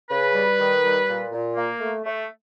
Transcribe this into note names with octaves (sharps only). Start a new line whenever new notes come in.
C#3 B4
G3
D#3
G3
A#2
A#2
A#3
A3
A3